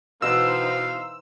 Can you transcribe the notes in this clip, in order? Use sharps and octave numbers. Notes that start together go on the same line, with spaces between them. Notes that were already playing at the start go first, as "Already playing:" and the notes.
B2 E3 D#4 C5 F5 E6